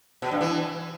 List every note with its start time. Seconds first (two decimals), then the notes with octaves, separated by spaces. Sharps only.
0.22 B2
0.31 G2
0.41 E3